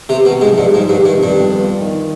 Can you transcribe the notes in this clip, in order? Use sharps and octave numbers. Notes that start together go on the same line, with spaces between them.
C3 B3
B2
C3
G#2
F3
G2
G#2 F4
G2
D#3
G2
F2
G2
B3
F4
D#3